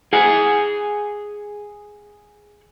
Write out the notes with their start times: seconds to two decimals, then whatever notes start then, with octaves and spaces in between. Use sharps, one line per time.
0.13 G#4 F#5 G#5